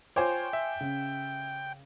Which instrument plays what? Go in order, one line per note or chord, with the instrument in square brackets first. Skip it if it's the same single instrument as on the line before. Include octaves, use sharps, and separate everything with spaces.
[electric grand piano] F4 C5 C#5 [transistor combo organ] G5 [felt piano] G#5 C6 D6
[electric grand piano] E5
[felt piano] C#3